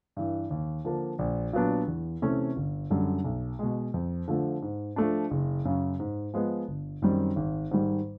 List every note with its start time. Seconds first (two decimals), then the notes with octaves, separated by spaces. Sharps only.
0.16 G2 E3
0.50 D#2
0.84 D3 F3 A#3 D4
1.19 A#1
1.53 A#2 F#3 B3 D4
1.88 E2
2.22 C3 E3 A3 C#4
2.56 G1
2.90 F#2 D3 G3
3.24 B1
3.59 B2 G#3
3.94 F2
4.28 D3 F3 A3
4.62 G#2
4.96 F3 A3 D4
5.31 F#1
5.65 F#2 C#3
6.00 G#2
6.34 F3 G#3 B3
6.68 G1
7.02 F#2 D#3 G3 C4
7.36 G#1
7.71 G#2 D#3 G3